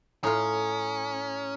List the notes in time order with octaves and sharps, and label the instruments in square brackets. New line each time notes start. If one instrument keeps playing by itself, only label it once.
[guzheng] A2 F4 [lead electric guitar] C#4 [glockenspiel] A#5 D#6